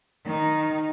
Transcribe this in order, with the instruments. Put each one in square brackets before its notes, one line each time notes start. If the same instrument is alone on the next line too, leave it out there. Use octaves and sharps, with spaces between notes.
[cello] D#3 D#4